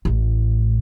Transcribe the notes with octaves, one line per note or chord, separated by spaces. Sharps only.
A1 A2